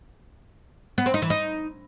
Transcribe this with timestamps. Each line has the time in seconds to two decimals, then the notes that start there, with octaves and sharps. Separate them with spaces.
0.98 B3
1.06 C4
1.14 D#4
1.22 E3
1.30 D#4